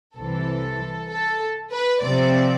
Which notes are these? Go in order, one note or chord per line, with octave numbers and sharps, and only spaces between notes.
C2 C3 E3 A4
A4
B4
C3 F3 C4 D5